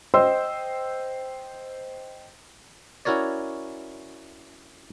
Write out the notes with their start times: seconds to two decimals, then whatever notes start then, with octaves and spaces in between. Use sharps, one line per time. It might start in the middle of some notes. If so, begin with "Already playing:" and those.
0.14 C5 D#5 G5 C6 E6
3.05 C#4 E4 F#4 A#4 C#5 D5